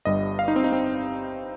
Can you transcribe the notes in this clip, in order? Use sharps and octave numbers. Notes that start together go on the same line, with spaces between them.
G1 G2 G3 D#5
F5
D#4
C4
D#4
C4